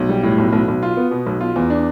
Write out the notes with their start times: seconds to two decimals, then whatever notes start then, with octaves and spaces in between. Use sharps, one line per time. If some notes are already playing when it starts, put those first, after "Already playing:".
Already playing: B1
0.09 G3
0.23 A2
0.38 B1
0.52 B1
0.68 B1
0.83 F4
0.97 B3
1.11 B2
1.26 B1
1.41 F4
1.56 E2
1.70 D4